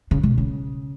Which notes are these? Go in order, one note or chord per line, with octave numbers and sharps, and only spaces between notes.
C#3
B2
C#3